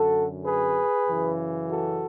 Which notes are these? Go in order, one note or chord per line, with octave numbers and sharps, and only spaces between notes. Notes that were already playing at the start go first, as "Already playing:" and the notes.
Already playing: F#2 D3 F#4 A4
G#4 B4
F#2 C#3 E3
F#4 A4